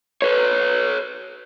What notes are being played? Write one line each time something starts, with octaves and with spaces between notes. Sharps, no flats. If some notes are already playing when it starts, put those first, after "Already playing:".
B4 C#5